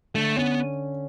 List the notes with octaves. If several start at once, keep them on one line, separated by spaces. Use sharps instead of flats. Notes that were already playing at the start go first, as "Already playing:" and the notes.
D3 A3
B3 C#4